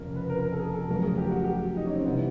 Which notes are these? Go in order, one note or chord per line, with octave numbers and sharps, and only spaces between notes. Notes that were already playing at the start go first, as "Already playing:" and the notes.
Already playing: F1 F2 C#3 A#4
B4
A#4
A#4
A4
G#4
A4
F2 C#3 F#3 A3 A#4
G#4
G4
F#4
G4
D#4
C#4
C4
C3 E3 G3 B3